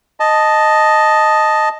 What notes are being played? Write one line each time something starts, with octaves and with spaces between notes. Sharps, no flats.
D#5 A5